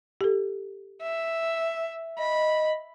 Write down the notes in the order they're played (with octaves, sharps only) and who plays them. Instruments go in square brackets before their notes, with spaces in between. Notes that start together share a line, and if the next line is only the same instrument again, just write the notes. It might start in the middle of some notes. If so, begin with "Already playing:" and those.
[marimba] G4 A4
[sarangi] E5
[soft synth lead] D#5 [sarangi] B5